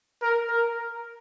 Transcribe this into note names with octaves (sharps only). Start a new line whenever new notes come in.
A#4
A#4